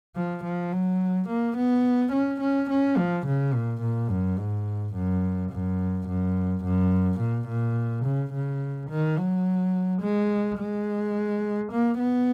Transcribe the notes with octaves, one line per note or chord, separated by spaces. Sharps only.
F3
F3
F#3
A#3
B3
C#4
C#4
C#4
F3
C#3
A#2
A#2
F#2
G#2
F#2
F#2
F#2
F#2
A#2
A#2
C#3
C#3
D#3
F#3
G#3
G#3
A#3
B3